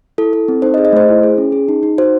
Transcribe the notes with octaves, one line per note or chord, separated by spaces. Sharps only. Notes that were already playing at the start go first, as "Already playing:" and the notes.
E4 A4
A4
C4
D#4 C5
D#5
G#4
D#5
A3 C5
E4
G#4
C#4
G#4
D#4
D#4
F#4 C5